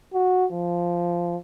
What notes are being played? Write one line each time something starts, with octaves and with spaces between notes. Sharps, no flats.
F#4
F3